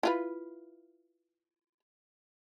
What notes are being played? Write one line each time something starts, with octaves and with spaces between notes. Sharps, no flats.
E4 F4 B4